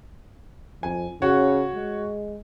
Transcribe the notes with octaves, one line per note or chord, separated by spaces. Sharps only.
F2 G#5
C#3 F#4 C#5
G#3